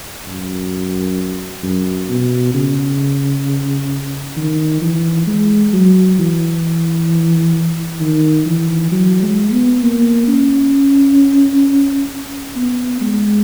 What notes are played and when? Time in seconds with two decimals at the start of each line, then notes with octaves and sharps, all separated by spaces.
0.27 F#2
1.63 F#2
2.09 B2
2.54 C#3
4.37 D#3
4.82 E3
5.27 G#3
5.73 F#3
6.19 E3
8.00 D#3
8.46 E3
8.92 F#3
9.23 G#3
9.53 B3
9.83 A#3
10.28 C#4
12.56 B3
13.01 G#3